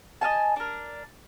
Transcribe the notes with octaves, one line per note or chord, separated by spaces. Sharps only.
D#5 F5 G#5 A5
D4 A#4